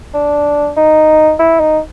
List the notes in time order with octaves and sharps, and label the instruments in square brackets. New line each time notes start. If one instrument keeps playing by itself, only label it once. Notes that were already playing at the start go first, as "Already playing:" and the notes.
[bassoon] D4
D#4
E4
D#4